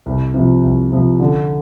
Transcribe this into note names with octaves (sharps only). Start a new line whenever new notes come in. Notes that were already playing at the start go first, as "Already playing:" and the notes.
C2
C3 F3
C2
C3 F3
D3